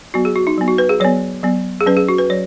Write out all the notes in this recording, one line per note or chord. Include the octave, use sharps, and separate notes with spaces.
F#3 B3 F#4
G#4
F#4
D#4
F#3 B3
F#4
B4
G#4
F#3 B3 C#5
F#3 B3
G#4
F#3 C#4 B4
G#4
F#4
B4
F#3 C#5